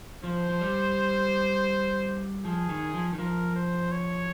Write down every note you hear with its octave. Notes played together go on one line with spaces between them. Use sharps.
F3 C5
F3
G3
F3 G#4
D#3
F3
D#3
F3 A#4
C5
C#5